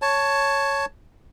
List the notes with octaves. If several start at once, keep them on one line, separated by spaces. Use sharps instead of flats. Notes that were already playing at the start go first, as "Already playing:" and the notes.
C#5 A5